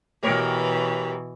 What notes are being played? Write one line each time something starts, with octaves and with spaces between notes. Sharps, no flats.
B2 E3 G4 A#4 C#5